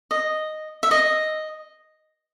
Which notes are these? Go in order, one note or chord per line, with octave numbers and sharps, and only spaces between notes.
D#5
E5
D#5